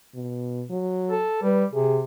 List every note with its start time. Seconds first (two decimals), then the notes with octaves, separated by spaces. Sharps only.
0.14 B2
0.70 F#3
1.10 A4
1.43 G3 B4
1.73 C3 G#4